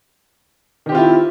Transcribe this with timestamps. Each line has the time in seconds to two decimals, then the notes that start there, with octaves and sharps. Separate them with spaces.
0.86 D#3
0.89 G4
0.92 C4
0.95 F4
0.98 E4